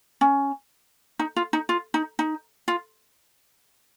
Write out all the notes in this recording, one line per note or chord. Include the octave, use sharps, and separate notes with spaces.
C#4
D#4
F4
D#4
F4
D#4
D#4
F4